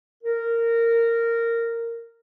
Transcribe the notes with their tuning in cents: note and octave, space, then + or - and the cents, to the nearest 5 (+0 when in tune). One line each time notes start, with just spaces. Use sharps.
A#4 -15